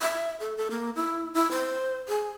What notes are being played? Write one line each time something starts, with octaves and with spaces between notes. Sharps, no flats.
E5
A4
A4
A#3
E4
E4
C5
G#4